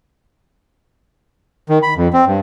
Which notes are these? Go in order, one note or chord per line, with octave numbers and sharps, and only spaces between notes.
D#3
B5
F2
C4
G2